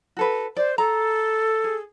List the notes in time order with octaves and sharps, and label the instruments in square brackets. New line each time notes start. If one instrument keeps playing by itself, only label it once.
[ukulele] F#4 A4 B4
[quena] C5 [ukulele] D5
[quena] A4 [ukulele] A#5
[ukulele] G#4